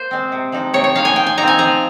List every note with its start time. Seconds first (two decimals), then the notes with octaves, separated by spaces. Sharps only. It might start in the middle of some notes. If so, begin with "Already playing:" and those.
Already playing: A#3 C5
0.11 G#3 C4
0.32 C3
0.52 F3 G#3 D#4
0.73 C3 C#5
0.84 C#5
0.95 F3 G#3 D#4 F5
1.05 G#5
1.16 F3 G5
1.27 G#5
1.38 C4 D#4 A#5
1.48 G#5
1.58 F3 A#5